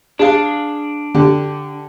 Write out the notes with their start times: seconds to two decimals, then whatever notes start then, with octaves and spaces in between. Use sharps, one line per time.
0.19 D4 G#4 F5
1.15 D3 G4